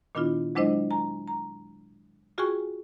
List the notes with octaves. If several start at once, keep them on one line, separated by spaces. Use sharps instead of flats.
A#2 D#3 B3 D4 E4 F4
F#3 G#3 D4 E4 C5 D#5
G#5 A#5
A#5
F4 F#4 G#4 G5 G#5 C#6